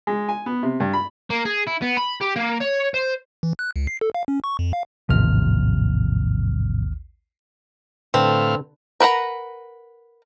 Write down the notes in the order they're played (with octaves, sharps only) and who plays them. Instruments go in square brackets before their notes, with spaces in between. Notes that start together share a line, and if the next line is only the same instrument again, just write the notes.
[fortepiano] G#3
G#5
B3
C3
G2
B5
[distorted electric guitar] A#3
G#4
E4
B3
B5
G4
A#3
C#5
C5
[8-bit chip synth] E3
F#6
C#2
C7
A4
F5
C#4
C#6
F2
F5
[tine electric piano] A1 D#2 F6 [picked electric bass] G#2 C3 F3
[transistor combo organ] A2 F5 [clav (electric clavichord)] D3 B4 A5 [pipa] C4
[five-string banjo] A#4 B4 F#5 A#5